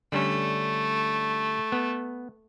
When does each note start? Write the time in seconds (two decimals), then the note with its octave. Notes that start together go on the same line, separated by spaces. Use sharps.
0.12 D3 G3 A3 C#4
1.72 B3